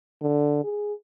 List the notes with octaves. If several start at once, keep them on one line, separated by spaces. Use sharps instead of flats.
D3
G#4